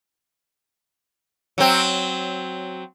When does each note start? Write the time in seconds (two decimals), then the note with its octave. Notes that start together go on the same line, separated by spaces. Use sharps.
1.58 F#3 C4